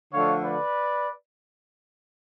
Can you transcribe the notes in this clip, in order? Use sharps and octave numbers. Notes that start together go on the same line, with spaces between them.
D3 F3 A3 D4 F4 C#5 F5
B4 D5